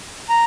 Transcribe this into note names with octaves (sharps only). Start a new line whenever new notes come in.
A#5